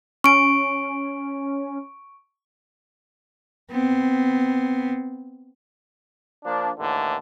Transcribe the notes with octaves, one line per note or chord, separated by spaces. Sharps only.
C#4 C#6 D7
B3 C4
F3 A#3 D4
D#2 A2 D3 E3